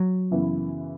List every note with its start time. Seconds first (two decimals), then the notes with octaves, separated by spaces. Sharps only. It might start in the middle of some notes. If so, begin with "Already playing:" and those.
Already playing: F#3
0.31 F#2 C#3 E3 B3 E4